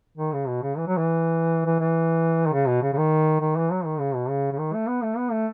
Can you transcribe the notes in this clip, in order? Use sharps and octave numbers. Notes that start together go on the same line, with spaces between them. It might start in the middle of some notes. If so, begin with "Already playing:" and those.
D#3
C#3
B2
C#3
E3
F#3
E3
E3
E3
D#3
C#3
B2
C#3
C#3
D#3
D#3
E3
F#3
D#3
C#3
B2
C#3
C#3
D#3
A3
B3
A3
B3
A3